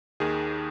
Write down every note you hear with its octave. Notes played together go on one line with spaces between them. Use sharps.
D#2 D#3 G#4